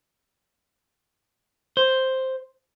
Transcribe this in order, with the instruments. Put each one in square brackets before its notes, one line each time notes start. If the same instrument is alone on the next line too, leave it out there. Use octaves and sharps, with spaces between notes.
[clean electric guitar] C5